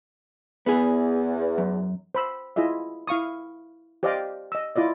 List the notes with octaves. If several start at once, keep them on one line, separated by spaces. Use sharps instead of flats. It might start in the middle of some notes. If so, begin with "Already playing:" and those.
E2 B3 G#4
F#2
C5 B5 E6
E4 F4 G#4 D#5 E5
E4 F5 C#6 D#6
G4 C5 D5 D#5 F5 G5
D#5 E6
E4 F4 D5 D#5